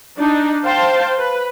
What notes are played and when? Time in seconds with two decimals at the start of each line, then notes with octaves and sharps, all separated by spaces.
0.18 D4 D#4
0.64 C5 F5 G5 A5 C6
1.18 B4